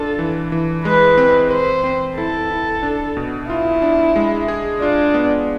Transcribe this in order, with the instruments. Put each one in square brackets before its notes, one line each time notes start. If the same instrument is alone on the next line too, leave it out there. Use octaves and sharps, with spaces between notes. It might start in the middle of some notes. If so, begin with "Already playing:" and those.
Already playing: [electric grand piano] D4 F4 [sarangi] A4
[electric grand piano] E3
E3
[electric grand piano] G#3 [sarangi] B4
[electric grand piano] C4
[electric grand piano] B4 [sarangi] C5
[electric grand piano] C4
[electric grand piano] E4 [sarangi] A4
[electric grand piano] E4
D4
B2
[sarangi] E4 [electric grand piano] F4
[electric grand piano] D4
G#3
G#4
[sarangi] D4 [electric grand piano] F4
[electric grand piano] B3